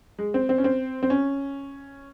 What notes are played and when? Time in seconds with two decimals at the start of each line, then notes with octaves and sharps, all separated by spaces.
0.19 G#3
0.34 C4
0.49 C4
0.58 C#4
0.64 C4
1.03 C4
1.10 C#4